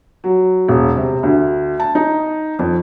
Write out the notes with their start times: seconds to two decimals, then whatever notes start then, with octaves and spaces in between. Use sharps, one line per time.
0.24 F#3
0.68 E1
0.96 C3
1.23 D2
1.80 A5
1.95 D#4
2.59 F2